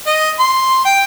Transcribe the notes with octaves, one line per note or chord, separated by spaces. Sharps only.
D#5
C6
G5